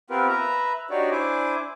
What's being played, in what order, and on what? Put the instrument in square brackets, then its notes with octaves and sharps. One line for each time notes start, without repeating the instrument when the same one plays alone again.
[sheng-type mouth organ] B3 C4 F4 G4 A#4 B4
B4 E5 A#5
D4 D#4 F#4 G4 C#5 D5
D4 E4 C5 G#5 D6